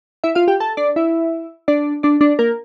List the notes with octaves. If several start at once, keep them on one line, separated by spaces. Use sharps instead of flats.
E4 E5
F4 F5
G4 G5
A4 A5
D4 D5
E4 E5
D4 D5
D4 D5
D4 D5
A#3 A#4